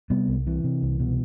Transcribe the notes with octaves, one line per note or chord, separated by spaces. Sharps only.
C3 G3 B3
C2
C3 E3
C3
C2
B2